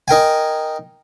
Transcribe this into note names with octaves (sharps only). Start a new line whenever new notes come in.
D#4 A#4 G5 G#5